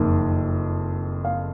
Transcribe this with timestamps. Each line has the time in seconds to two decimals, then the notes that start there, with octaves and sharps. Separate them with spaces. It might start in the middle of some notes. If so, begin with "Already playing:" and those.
Already playing: F#1 F2 D#3
1.25 F5